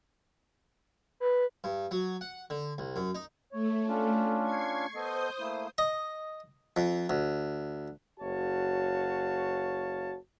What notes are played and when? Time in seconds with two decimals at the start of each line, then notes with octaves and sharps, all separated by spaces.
1.20 B4
1.64 G2
1.91 F#3
2.21 F#5
2.50 D3
2.78 C2
2.96 F#2
3.15 D#4
3.52 A3 C#5
3.87 C#4 D4 F4
4.42 C#6 G#6 C7
4.95 B3 A4 C5 D#5 D#6 G6
5.39 A3 A#3 E4
5.78 D#5
6.77 F2
7.10 D2
8.20 F#1 F#4 C#5 F5 A5